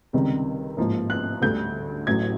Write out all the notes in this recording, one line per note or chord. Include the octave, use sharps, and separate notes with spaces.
C#2 C3 D#3 G3
A1 G#2 F3 A#3
F#6
D2 D3 G3 G6
A1 A2 F#3 G#6